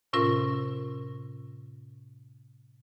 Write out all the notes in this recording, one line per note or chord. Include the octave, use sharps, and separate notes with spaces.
A2 C3 C#4 F4 A#4 C6